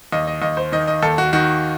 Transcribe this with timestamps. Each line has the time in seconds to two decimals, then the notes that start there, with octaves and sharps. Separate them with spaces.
0.12 D#2 D#5
0.27 D#5
0.42 D#2 D#5
0.57 C5
0.72 D#3 D#5
0.87 D#5
1.02 D#2 A4
1.18 F#4
1.33 D#3 F#4